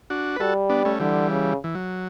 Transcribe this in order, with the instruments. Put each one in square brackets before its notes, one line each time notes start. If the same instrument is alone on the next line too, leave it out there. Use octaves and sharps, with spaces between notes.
[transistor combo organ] D4 F#4
B4
[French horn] G3 [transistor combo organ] F#4 A4
[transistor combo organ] B3 D4
A3 C#4
[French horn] D3 [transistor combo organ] E3 G3
[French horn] C#3
[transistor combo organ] E3
F#3